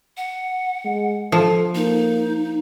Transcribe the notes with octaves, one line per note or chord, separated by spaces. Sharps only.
F#5
G#3
F3 A4
A#3 D#4